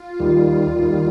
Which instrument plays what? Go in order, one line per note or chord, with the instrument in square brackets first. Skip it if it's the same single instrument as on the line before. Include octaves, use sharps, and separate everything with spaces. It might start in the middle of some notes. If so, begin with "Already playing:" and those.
Already playing: [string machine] F4
[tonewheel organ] D#2 D#3 G3
D#2 D#3 G3